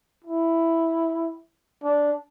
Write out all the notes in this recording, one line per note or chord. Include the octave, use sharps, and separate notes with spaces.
E4
D4